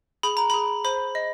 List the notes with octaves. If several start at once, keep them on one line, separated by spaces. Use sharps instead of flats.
G#4 B5
A#5
G#4 B5
C5 B5
D#5